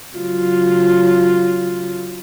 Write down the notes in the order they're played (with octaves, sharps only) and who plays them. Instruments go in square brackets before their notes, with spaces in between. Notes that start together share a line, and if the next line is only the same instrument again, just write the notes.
[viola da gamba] C#3 F#3 F4